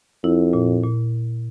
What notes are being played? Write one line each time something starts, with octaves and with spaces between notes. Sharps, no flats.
F2 E4
A#2
A#2